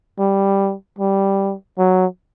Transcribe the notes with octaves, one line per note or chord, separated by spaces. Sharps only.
G3
G3
F#3